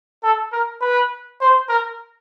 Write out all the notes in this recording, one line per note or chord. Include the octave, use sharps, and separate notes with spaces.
A4
A#4
B4
C5
A#4